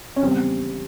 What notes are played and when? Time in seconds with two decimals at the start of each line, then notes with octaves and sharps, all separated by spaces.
0.16 C#4
0.22 E2 C#3 G3 C4